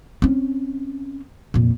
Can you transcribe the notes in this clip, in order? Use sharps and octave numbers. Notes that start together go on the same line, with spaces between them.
C4 C#4
F2 A#2